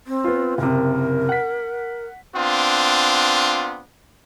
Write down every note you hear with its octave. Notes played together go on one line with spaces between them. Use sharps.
C4
B3 F4
F#1 C3 A#4
F#5 B6
B3 C4 D4 F4